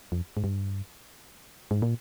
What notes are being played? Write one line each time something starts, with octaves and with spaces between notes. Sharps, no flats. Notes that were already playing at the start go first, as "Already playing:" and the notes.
F2
G#2
G2
G#2
A#2